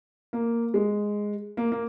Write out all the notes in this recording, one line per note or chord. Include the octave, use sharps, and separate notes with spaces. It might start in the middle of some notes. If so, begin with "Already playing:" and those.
A#3
G#3
A#3
A#3